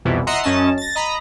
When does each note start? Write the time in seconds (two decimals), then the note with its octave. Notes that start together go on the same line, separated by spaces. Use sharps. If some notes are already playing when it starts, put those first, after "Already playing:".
0.05 C2 F2 B2 E3
0.27 D#5 E5 F#5 A#5 C6
0.43 F#2 C#4 D#5 A5
0.78 A6 A#6
0.95 D#5 A#5 B5